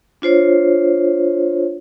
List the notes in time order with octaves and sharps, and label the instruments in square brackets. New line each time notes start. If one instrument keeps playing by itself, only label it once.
[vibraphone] D4 F4 C5 C#5